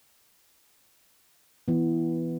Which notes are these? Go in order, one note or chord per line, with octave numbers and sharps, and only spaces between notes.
E3 B3